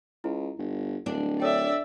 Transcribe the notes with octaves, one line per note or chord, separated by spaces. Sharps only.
C#2 E4
G1
D1 D4
A4 C#5 D5 E5 G5